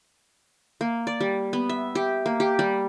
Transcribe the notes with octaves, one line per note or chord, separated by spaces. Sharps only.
A#3
D5
G3
B3
E5
G4
A#3
G4
G3